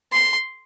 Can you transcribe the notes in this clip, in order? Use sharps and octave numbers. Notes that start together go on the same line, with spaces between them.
C6